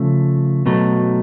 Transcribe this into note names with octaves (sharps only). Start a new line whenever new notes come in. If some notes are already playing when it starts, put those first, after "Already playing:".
Already playing: C#3 F3 A3
B2 F#3 A3